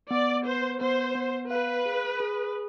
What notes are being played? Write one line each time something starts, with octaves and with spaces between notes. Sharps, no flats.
B3 D5
B4 C5
B3 C5
B3
B4 F5
G#4
G#4